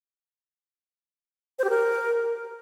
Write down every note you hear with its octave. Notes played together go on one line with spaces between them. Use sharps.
C5
G4
A#4